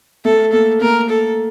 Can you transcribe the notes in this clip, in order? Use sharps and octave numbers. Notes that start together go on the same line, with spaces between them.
A3 A4
A#3 A4
A#3 A#4
A4